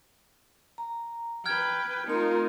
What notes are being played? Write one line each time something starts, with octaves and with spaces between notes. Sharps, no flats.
A#5
B4 G5 F6 G#6
A3 C4 D#4 F4 A#4 C6